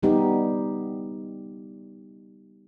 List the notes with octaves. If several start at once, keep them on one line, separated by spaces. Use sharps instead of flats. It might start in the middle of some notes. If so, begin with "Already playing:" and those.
C#3 G3 B3 D#4 G4